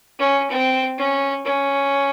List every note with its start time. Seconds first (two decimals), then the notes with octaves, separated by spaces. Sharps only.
0.19 C#4
0.50 C4
0.98 C#4
1.45 C#4